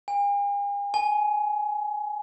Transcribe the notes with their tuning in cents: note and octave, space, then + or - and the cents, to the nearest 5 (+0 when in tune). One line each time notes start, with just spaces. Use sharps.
G#5 -45
G#5 +20